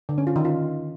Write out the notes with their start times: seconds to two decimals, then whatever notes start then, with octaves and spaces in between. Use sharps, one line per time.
0.09 D3
0.18 C#4
0.27 F4
0.36 D#3
0.45 F4